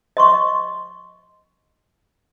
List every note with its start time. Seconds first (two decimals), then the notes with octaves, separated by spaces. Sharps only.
0.17 D#5 C6 C#6